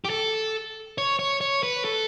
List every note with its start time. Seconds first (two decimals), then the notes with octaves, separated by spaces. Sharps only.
0.05 G4
0.10 A4
0.98 C#5
1.19 C#5
1.41 C#5
1.63 B4
1.85 A4